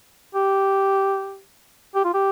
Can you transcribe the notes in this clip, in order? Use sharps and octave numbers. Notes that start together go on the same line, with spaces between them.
G4
G4
F4
G4